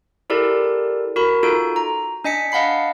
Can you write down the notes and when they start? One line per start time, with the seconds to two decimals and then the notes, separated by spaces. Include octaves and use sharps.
0.30 E4 G4 A4 A#4 D5
1.16 F#4 A#4 B5
1.43 D#4 F4 F#4 A4 D7
1.76 A#5
2.24 D4 D#5 G#5 B6 C#7
2.52 D#5 F5 F#5 A5 B5 C7